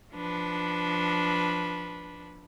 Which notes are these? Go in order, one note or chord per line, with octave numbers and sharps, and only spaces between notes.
F3 D4 B4